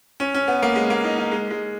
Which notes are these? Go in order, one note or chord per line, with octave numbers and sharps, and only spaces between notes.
C#4
C#4
B3
A#3
G#3
A#3
D#4
D#4
G#3
G#3